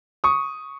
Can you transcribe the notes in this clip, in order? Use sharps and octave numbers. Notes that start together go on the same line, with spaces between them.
C#6 D#6